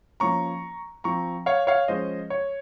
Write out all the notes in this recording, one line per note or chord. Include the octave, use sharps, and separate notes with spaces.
F3 A#3 C#4 A#5 C#6
F3 C4 A#5 C#6
C#5 F5
C#5 F5
F3 G#3 C#4 C5 D#5
C#5